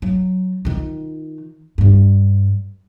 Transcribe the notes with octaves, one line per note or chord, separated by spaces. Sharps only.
F#3
D#3 F4
G2 G3